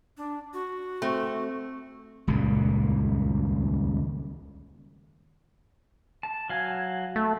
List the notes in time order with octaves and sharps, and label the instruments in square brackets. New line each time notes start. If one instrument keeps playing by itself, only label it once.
[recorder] D4
F#4
[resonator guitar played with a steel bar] A3 [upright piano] C4
[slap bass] D#1 C#2 F#2 A#2
[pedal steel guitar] A5
F#3 F5 G#5
[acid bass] A3